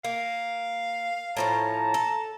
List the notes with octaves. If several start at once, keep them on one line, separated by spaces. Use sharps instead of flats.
A#3 F5
A2 F3 C#4 A5 A#5
A4